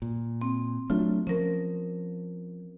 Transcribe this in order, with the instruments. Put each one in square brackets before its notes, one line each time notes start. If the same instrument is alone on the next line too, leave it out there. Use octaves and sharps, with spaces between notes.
[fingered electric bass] A#2
[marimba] C4
[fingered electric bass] F#3 A3 D4 [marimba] F4
[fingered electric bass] F3 [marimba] C#4 A#4